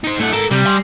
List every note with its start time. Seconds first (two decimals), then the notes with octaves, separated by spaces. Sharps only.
0.04 D#4 C5
0.19 A2 A3 F#5
0.33 G#2 A4 A#4
0.51 C3 G3
0.66 G#5 C6